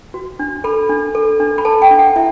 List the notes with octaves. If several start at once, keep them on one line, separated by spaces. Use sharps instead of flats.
F#4
D4
A4 B5
D4
A4
D4
B5
A4 A5
G5
D4
F#5
E4 E5